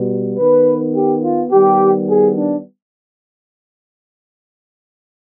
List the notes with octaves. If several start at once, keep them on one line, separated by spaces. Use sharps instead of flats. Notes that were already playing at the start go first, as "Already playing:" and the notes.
Already playing: B2 G3 B3
D#3 B3 B4
G4
F4
D#3 G3 B3 G4
G#4
D4